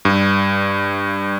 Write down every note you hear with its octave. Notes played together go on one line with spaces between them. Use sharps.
G2